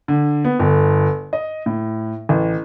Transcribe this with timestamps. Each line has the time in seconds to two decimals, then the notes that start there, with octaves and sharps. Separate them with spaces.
0.08 D3
0.45 B3
0.59 G1
1.33 D#5
1.66 A2
2.29 A1